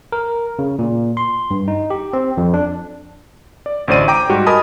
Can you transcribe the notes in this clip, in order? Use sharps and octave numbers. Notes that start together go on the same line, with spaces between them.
A#4
C#3
A#2
C6
G2
D#4
G4
C4
F2
D4
D5
A1 D2 C5 D5 D#7
G5 A#5 D6
G#2 G3 F#4 G4
A#4 D#5 G#5 A5 B5 D#6